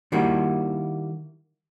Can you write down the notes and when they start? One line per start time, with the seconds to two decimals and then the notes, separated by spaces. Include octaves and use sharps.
0.12 D#3 G3 A#3 E4 F#4